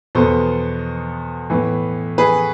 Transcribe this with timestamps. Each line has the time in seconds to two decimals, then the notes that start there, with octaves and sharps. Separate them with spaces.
0.15 E2 B2 B3 A4 C5
1.50 A2 E3 B3
2.18 G#4 B4